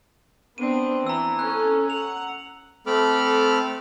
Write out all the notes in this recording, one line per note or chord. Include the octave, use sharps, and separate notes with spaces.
B3 C4 D4 D#7
E3 A#5 E6
C#4 A4 F#6
F#5 F7
A3 C4 A4 B5 D6 F6